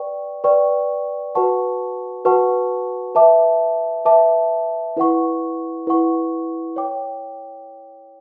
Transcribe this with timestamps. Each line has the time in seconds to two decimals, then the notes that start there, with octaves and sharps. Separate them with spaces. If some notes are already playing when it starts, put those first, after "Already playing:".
Already playing: B4 D5 G5 C#6
0.44 B4 D5 G5 C#6
1.35 F#4 B4 F#5 A5 C#6
2.25 F#4 B4 F#5 A5 C#6
3.15 B4 E5 A5 D6
4.05 B4 E5 A5 D6
4.97 E4 B4 F#5 C#6
5.87 E4 B4 F#5 C#6
6.76 C#5 G5 D6